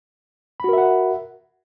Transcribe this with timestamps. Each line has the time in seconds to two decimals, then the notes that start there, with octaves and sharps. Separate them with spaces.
0.60 B5
0.64 F#4
0.69 A#4
0.73 E5
0.78 F#5